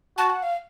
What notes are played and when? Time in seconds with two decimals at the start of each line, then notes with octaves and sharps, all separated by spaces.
0.17 F#4 A5
0.30 F#5
0.43 F5